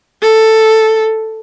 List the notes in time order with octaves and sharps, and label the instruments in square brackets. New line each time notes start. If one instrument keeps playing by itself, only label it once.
[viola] A4